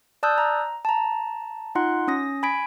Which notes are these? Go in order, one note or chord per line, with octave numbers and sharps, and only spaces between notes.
D5 A5 D#6 E6 F#6 G6
A#5
A5 A#5
D#4 F4 F#5 C6 F#6
C#4 D#6 A#6
G#5 B5 G#6 B6 D7